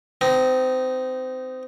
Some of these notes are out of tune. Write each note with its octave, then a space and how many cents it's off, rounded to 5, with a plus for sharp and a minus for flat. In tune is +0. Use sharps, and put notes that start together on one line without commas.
C4 -25 D#4 +0